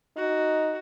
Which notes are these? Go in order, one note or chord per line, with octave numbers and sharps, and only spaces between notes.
D#4 F#4